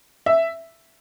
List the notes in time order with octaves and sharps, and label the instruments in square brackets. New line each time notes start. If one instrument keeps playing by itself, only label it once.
[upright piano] E5